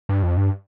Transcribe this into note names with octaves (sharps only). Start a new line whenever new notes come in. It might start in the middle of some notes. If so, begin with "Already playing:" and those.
G2
F2
G2